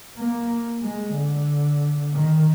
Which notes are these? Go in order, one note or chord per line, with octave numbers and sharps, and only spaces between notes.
A#3
G#3
D3
D#3